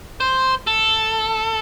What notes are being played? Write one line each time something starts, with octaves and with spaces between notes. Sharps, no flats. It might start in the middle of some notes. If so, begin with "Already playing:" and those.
C5
A4